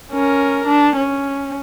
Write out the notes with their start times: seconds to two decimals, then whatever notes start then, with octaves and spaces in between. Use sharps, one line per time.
0.12 C#4 A#4
0.67 D4
0.96 C#4